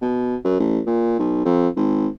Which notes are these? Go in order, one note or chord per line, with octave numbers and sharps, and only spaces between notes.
B2
F#2
A1
A#2
B1
F2
G#1